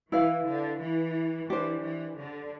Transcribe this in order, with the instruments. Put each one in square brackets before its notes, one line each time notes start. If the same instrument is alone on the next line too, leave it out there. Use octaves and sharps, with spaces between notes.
[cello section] E3 [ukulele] E4 B4 F5
[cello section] D3
E3
[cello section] E3 [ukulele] D4 G4 C5
[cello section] E3
D3